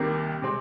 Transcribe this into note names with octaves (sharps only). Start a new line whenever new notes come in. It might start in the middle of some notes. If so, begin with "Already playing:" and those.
Already playing: C2 C3 D#3 A#3
C3 G#3 C4